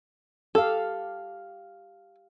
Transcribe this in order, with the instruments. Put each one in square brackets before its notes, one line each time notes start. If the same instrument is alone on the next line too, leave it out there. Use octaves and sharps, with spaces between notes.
[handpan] G4 F5 [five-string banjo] A4